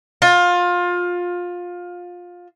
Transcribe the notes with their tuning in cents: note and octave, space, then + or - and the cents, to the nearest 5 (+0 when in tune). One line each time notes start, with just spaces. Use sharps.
F4 +20